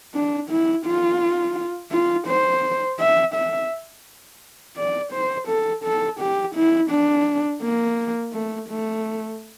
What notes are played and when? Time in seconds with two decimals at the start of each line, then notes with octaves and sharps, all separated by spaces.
0.14 D4
0.50 E4
0.86 F4
1.92 F4
2.28 C5
3.00 E5
3.34 E5
4.77 D5
5.13 C5
5.48 A4
5.84 A4
6.20 G4
6.55 E4
6.91 D4
7.62 A#3
8.33 A3
8.69 A3